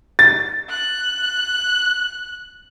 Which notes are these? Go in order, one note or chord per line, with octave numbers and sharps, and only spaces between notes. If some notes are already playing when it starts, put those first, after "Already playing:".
A6
F#6